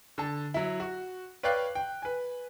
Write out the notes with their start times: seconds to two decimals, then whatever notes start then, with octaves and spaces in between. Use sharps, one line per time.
0.18 D3 A5
0.54 F#3 E4
0.80 F#4
1.43 B4 C#5 D5 F5 G5 F#6
1.75 G5
2.02 B4 G#5